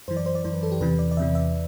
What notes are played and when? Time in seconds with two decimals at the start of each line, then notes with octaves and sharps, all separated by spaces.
0.08 F#2 E3 C5
0.17 D5
0.26 C5
0.35 D5
0.44 F#2 E3 C5
0.54 B4
0.63 A4
0.72 G4
0.81 E2 C3 E3 B4
0.99 D5
1.11 D5
1.17 E2 C3 E3 E5
1.35 E5